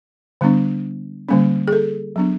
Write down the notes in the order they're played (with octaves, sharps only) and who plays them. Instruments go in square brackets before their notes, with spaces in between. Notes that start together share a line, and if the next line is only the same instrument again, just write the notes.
[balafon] D3 G3 B3 D4
D3 G3 A#3 C#4
G#4
A4
F#3 B3 D4